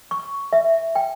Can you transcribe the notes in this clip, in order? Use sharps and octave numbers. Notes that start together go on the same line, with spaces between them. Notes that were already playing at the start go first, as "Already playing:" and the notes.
C#6
E5
G5